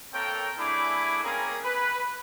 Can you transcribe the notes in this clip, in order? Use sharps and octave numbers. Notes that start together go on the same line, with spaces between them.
A#3 C4 A4 A#4 C#5 G5
A3 D4 E4 G#4 B5 D6
A#3 C4 C#4 G#4 A#4
B4